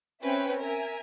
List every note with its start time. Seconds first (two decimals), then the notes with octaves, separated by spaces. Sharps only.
0.23 C4 C#4 B4 E5 G5
0.61 A#4 E5 G#5